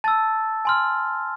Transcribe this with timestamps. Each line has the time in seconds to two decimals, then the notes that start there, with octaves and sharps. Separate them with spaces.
0.04 A5 E6 A6
0.65 G#5 C6 F6